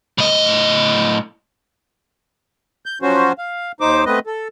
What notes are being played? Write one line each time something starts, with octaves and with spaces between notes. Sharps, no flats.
A2 D#5
G6
F3 F#3 C#4 F#4 C5
F5
D#2 D#4 C5 D6
A3 B3 C4 B4 D#5
A4